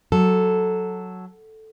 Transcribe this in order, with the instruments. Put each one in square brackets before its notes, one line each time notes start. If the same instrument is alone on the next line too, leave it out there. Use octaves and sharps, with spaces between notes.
[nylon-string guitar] F#3 [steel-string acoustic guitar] A4